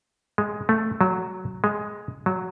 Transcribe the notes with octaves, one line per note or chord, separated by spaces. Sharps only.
G#3
A3
F#3
G#3
F#3